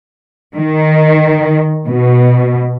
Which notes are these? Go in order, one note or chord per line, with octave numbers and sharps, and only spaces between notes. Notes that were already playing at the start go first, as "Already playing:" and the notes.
D#3
B2